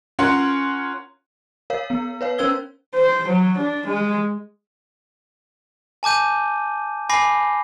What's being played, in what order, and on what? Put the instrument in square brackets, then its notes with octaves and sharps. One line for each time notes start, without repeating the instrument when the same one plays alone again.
[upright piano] C#4 F4 A#4 F#5 C6
[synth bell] A#4 C#5 F5
B3
B4 C#5 F5
C#4 A#4 C5 E6 G#6 G7
[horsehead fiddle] C5
F#3
D4
G#3
[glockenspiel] G#5 A5 D6 G6 D#7
G#5 B5 D6 A#6 C7